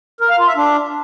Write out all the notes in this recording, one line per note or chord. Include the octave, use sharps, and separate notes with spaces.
A#4
F5
F4
E5
D4